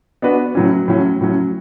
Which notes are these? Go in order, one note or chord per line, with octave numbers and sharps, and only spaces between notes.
B3 D4 F#4 B4
A2 F#3 C#4
A2 F#3 C#4
A2 F#3 C#4